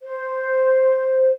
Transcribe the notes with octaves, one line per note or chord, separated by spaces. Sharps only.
C5